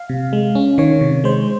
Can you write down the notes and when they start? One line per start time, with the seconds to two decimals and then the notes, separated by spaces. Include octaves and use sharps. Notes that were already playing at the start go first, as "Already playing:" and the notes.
Already playing: F5
0.09 C3
0.33 G#3
0.55 C#4
0.78 D#3 C#5
1.01 C3
1.24 G#3 C5